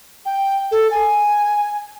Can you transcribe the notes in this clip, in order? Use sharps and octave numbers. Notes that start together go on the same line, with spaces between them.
G5
A4
G#5